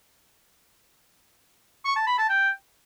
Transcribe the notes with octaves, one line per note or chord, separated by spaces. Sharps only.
C#6
A5
B5
A5
G5